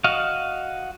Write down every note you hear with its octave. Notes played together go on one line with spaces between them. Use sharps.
F#4 D#5 F5